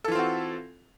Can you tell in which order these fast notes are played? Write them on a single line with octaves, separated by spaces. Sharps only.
A4 E3 F4 C4 F#4